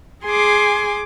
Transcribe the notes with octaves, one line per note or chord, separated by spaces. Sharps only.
G#4 G#5 C6 D6